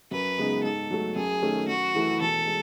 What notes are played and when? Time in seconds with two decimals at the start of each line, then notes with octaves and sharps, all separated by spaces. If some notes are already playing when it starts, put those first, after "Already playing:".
0.11 F#2 B4
0.38 C#3 G#3 B3 D#4
0.63 G#2 A4
0.91 F#3 A3
1.15 F#2 G#4
1.42 D#3 A3 C#4
1.68 F#2 F#4
1.95 E3 A3 E4
2.21 E1 A4
2.47 G#3